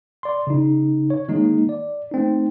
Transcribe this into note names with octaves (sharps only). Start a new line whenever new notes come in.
D5 C6
C#3 D#4
C#5
D#3 G#3 A#3 D#4
D5
A3 C4 D#4